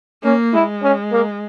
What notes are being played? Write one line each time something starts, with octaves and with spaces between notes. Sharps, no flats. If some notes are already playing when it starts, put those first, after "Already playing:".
A#3 C#4
G#3 E4
C#4
A#3